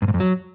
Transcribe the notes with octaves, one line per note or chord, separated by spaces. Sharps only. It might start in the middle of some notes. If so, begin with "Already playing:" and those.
G2
G#2
F2
F#3